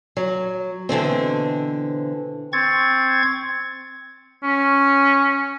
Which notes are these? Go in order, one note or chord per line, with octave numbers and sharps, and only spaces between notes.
F#3
B2 D3 E3 C4
C4 C#6 G#6 A6
C#4